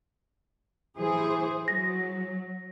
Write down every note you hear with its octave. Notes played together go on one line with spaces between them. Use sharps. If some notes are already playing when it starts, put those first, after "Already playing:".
E3 G#4 C5
F#3 A#6